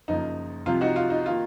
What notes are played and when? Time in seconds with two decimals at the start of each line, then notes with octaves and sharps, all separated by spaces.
0.08 F#1 F#2 F3 A#3 D#4
0.66 C2 C3 F3 F4
0.81 D#4 F#4
0.96 F4
1.10 D#4
1.26 D#3 A#3 F4